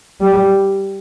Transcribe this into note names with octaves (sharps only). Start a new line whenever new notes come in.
G3